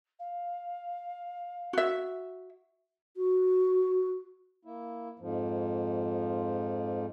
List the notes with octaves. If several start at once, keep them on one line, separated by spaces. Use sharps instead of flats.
F5
F#4 E5
F#4
A#3 E4
F2 G#2 F3